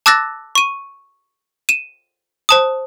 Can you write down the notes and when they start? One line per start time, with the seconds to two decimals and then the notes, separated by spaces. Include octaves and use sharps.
0.06 A5 D6 E6 F#6 A6 A#6
0.55 C#6 D#7
1.69 D#7 E7
2.49 C5 A5 D#6